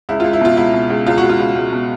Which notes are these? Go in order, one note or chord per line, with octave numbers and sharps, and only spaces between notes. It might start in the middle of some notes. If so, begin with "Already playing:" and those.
C#2 E4
F4
C#2
E4
B2 F4
C#2 E4
B2
C#2
C#2 F4
C#2 F#4
F4
C#2
C#2
B2